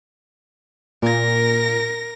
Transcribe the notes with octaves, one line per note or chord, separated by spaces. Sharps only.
A#2 A#4 A#6